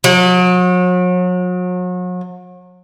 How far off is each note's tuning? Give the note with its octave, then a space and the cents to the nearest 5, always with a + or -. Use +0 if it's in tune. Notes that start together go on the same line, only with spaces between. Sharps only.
F#3 -40